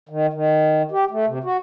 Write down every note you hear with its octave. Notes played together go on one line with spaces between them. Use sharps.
D#3
D#3
G4
A3
C3
F#4